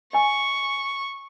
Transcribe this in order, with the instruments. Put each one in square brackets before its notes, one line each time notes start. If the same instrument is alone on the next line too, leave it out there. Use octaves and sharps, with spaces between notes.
[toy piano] D#5 G#5 [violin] C#6